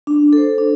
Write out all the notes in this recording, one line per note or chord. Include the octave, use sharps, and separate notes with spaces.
D4
A4 C5
D4